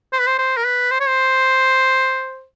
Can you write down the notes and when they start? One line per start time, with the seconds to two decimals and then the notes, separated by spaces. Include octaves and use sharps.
0.13 C5
0.20 B4
0.27 C5
0.39 C5
0.57 A#4
0.66 B4
0.91 C5
1.00 C#5
1.08 C5